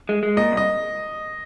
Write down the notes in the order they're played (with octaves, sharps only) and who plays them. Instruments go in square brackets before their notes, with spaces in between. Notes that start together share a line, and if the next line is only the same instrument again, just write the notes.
[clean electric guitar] G#3
G#3
[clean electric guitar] A#2 [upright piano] D#5
[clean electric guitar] C2
[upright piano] D#5